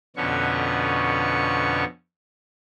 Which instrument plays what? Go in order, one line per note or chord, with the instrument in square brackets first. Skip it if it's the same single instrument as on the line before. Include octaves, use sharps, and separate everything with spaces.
[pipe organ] F2 B2 D3 B3 C#4 C#6